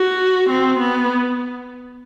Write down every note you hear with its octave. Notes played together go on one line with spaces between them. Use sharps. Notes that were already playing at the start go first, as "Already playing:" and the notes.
Already playing: F#4
C4
B3